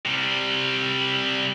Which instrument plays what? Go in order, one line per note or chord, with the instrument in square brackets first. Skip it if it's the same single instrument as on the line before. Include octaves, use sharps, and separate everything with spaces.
[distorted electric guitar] C3 G3